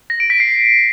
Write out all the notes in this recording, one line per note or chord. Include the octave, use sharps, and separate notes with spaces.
A#6
D7
B6
C7